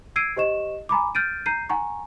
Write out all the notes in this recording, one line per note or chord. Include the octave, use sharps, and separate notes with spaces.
E6 G#6 C7 D7 D#7
G4 C5 D#5 C#6 E7
G#5 A#5 B5 D6
F6 G6 A6 D7 D#7
A#5 G6 C7 D#7
F#5 G#5 A#5 C#6